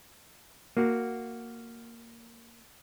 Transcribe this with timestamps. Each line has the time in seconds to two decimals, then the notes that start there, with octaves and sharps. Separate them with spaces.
0.77 A#3 F#4